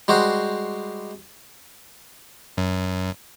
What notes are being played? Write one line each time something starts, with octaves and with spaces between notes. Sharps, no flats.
G3 G#3 F#4 C5
F#2